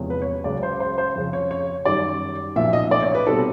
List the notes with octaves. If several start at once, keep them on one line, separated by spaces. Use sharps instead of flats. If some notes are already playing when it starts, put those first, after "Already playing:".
Already playing: E2 C3 F3 G#3 C#4
B4
C#5
C#2 C#3 F#3 D5
C5
C5
C5
F2 C#3 F3
C#5
C#5
F#2 D#3 G3 D5
B1 A#2 F3 E5
D#5
D5
C#5
B4
B2 G3 C4 D#4 A4